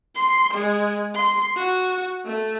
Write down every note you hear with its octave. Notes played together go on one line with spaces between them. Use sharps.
C6
G#3
C6
F#4
A3